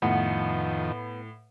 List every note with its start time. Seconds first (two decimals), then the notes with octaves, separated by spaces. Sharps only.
0.02 F2 A2 D#3 B3